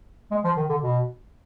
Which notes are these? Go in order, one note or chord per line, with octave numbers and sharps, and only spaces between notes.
G#3
F3
D#3
D3
B2